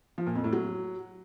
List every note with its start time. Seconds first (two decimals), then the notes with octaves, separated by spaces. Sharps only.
0.18 F3
0.26 A#2
0.35 F2
0.44 A2
0.53 F#3